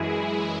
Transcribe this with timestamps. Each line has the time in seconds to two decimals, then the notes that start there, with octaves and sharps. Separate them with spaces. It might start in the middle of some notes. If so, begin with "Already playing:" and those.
Already playing: F#2 E3 G#3 E4 G#4
0.17 E4 G#4